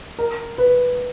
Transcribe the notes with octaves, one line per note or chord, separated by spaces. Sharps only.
A#4
B4